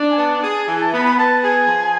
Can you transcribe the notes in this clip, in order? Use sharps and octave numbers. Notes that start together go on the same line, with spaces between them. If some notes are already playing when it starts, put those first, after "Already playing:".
Already playing: D4
G#5
B3 A5
G#4
E3 G#5
A5
B3 B5
B5
B3 A5
G#4 G#5
F3